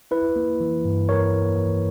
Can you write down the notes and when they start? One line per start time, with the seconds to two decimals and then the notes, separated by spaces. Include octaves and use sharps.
0.11 E4 B4
0.36 A#3
0.60 E3
0.85 G2
1.09 E4 A#4 C#5
1.34 A#3
1.58 E3